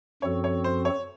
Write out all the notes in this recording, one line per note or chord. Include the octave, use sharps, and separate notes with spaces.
F#2 F3 C4 F#4 A4 C#5
C#5
C5
C#5